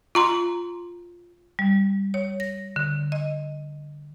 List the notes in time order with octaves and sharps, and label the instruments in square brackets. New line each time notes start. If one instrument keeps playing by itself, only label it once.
[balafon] F4 A#5 C6
[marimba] G3
C#5
A#6
D3
D#5